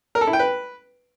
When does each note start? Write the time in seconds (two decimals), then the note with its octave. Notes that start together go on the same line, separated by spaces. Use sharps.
0.15 A#4
0.21 A4
0.27 E4
0.33 G5
0.39 B4